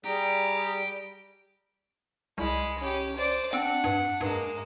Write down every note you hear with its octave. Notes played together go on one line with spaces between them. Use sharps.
G3 G4 G#4 A#5
C2 G#3 B5
C#4 G4
C5 D5
C4 D4 F#5
G2
G2 G#3 A#3